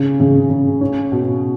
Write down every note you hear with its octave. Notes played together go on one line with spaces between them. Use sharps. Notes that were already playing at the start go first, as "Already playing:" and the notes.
Already playing: C#3
C#3
C#3
C#4
B2